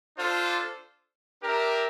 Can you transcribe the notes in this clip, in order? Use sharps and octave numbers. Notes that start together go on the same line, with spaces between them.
D4 F4 A4 C5
D4 G4 A#4 E5